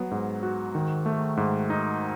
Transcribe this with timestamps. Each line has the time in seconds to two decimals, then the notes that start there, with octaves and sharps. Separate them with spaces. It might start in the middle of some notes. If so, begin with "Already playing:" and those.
Already playing: F#3 B3
0.11 G#2
0.43 F#4
0.75 D#3
1.06 A3
1.37 G#2
1.70 D#4